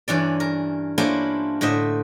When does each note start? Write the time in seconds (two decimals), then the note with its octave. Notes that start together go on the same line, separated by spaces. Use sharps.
0.08 G2 E3 C#4 D5
0.40 A#4
0.98 A#3 C#4 D4 E4 F4 C5
1.61 A2 D3 C5 D#5 E5